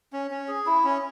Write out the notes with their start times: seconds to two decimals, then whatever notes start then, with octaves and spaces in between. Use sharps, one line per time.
0.13 C#4
0.31 C#4
0.48 G#4
0.66 E4
0.84 C#4